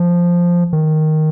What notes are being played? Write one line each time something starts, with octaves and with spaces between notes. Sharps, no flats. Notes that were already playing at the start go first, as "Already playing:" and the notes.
Already playing: F3
D#3